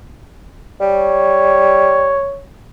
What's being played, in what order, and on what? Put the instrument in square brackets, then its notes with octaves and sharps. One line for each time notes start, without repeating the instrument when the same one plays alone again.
[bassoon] G3 [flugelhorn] C#5